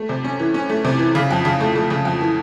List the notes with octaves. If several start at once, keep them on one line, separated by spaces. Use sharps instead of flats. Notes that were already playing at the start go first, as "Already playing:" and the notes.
Already playing: A3
C3
C#4
E3
C#4
A3
C3
E3
C#3
F2
C#3
A3
A3
C#3
F2
E3